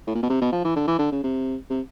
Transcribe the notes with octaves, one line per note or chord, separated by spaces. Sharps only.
A2
A#2
B2
C3
B2
F3
E3
D3
E3
D3
C#3
C3
C3